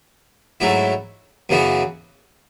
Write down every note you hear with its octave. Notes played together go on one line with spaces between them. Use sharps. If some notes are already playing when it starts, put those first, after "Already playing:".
G#2 F#3 A3 E4
F#2 C#3 E3 B3 F#4